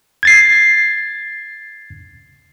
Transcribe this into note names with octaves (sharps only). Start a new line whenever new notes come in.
G#6 A6 C7